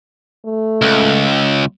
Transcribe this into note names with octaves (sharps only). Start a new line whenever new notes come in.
A3
C#2